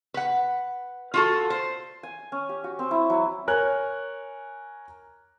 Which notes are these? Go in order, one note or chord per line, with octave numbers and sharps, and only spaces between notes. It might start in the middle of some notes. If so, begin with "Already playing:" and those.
B4 F#5
F4 F#4 A4
C5
G#5
C#4
G4
F#4
C4
E4
F#3
A#4 C#5 G#5 F#6